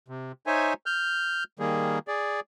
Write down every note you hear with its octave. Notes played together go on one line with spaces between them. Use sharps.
C3
D#4 C5 C#5 E5 G#5
F6 G6
D#3 G3 A#3 G#4
G#4 D5